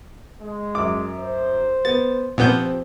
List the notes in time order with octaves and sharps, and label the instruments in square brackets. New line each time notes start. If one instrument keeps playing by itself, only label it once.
[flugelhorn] G#3
[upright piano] F#2 D6
[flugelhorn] C5
[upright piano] B3 [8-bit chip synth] A6
[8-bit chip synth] A#2 B3 G6 [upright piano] F3 C4 [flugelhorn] G4